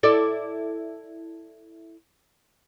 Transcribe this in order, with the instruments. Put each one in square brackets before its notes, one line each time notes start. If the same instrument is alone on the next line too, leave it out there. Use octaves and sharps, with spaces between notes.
[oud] E4 A4 D5